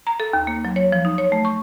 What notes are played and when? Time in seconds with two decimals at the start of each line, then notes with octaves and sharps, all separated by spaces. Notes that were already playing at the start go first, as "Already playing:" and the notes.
0.07 A#5
0.20 A4
0.33 D#2
0.47 A#3
0.65 F#3
0.76 C#5
0.92 F3
1.05 D#4
1.18 C#5
1.32 A3
1.45 C#6